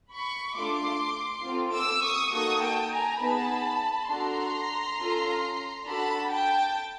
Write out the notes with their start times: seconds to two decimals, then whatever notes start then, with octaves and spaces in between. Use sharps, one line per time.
0.12 B5 C#6
0.56 A3 D4 F4 C6 D6
1.44 C4 F4 A4
1.74 D6 E6
2.04 C#6 D#6
2.33 A#3 D#4 F#4 A4 C#6 D#6
2.62 G5 A5
2.92 G#5 A#5
3.21 B3 D#4 G#4 A5 B5
4.10 D4 F#4 A4 A#5 C6
4.98 C#4 F4 A4
5.86 D4 F#4 A4 A5 B5
6.30 G5 A5